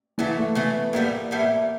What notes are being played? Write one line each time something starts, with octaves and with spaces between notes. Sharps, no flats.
C#3 E3 F#3 A3
A3
C#3 F#3 A3 B3
A2 E3 G3 A#3 B3
A2 E3 G3 B3